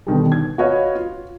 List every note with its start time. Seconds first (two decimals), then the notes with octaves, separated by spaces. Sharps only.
0.07 B2 D3 D#3 G3
0.32 G#6
0.58 F#4 B4 C#5 D#5 F5
0.95 F4